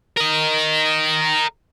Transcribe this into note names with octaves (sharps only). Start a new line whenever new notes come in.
A#4 D#5